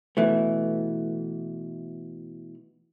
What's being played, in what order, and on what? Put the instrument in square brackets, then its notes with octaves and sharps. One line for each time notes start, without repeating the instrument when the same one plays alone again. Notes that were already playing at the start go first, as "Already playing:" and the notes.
[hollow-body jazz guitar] B2 E3 A3